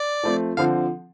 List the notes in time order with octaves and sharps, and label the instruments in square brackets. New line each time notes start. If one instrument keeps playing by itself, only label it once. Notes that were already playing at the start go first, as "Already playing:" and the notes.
Already playing: [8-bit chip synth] D5
[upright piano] F3 A3 C4
[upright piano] D3 F3 C4 [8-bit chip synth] F5